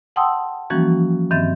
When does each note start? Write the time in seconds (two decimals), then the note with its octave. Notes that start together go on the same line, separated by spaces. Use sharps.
0.16 F#5 G5 A5 C6 D#6 E6
0.70 E3 F3 G3 A#3 C#4 F#4
1.31 G2 D#3 C4 E5 A6